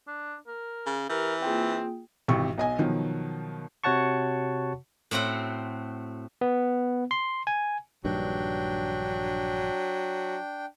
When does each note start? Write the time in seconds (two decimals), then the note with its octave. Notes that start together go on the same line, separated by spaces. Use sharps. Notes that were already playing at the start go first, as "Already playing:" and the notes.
0.07 D4
0.47 A#4
0.86 C#3
1.09 E3 G4 A#4 G6
1.42 A#3 C4 F4 G#4 G5
2.28 G#1 C3 E3 G4 C#6
2.58 B1 D#5 G#5
2.78 B2 D#3 F3 F#3
3.84 C3 F#4 C#5 F#5 A5 C#6
5.11 A2 A3 C4 F#4 F#5
6.41 B3
7.11 C6
7.47 G#5
8.05 A#1 G2 D#3 F#3 D4 G5